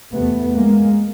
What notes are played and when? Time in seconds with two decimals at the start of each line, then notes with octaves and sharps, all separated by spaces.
0.13 E2 C3 A3 B3
0.56 G#3 A#3